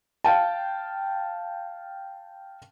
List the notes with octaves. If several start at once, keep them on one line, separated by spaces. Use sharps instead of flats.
F5 G5 A5